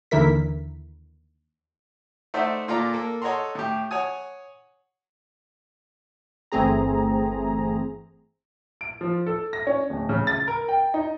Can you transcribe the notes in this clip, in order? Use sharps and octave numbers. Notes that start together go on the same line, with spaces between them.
D#2 D3 E3 E4 A#4 B6
A3 D#4 C5 D5 E5 F#5
A#2 F4 A4 D5 A#5 D6
A#3 A4
A4 C#5 D#5 F#5 A#5 C6
A2 G4
C#5 F#5 G#5 D#6
G1 E3 A3 C4 G#4 A#5
D7
F3
A4
A#6
C#4
D1
C#3
A6
A#4
G5
D#4